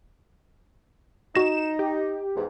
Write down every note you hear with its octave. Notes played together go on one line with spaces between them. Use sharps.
D#4 F#4 A#6 E7
G4
E2 G#2